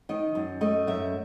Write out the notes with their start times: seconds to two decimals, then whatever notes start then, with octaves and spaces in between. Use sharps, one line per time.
0.09 D#3 D#5
0.35 F#2
0.61 A3 D#5
0.87 F#2 E5